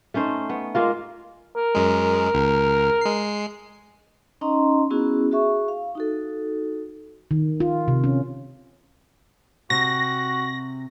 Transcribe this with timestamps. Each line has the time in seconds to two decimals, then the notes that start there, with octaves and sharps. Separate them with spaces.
0.14 A3 C#4 D#4 C5
0.49 B3
0.75 G#3 A#3 F4
1.56 A#4
1.75 F#2 G#3
2.34 C#2
3.01 G#3 C7
4.41 C#4 D#4 D#5 A#5 C6
4.91 B3 C#4 E4 F#4 G#4
5.31 F#4 G#4 E5 C#6
5.68 F5
5.95 D#4 F#4 A4
7.31 D#3
7.60 F4
7.88 C3
8.04 C#4
9.70 C3 F#4 A#6